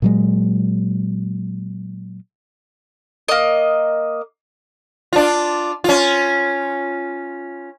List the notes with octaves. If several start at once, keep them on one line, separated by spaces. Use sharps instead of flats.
A#2 F#3 G#3
A#3 D#5
D4 F4
C#4 F4